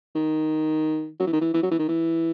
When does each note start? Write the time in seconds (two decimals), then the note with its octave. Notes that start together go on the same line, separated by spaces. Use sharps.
0.15 D#3
1.20 F#3
1.27 E3
1.33 D#3
1.41 E3
1.54 E3
1.63 F#3
1.71 E3
1.79 D#3
1.88 E3